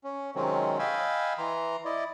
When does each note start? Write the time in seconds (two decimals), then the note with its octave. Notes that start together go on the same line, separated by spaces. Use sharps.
0.04 C#4
0.35 C3 D#3 F#3 G#3 C4 C#4
0.79 D#5 F5 G5 G#5 B5 E6
1.38 E3 A#5 C6
1.85 E4 D5 D#5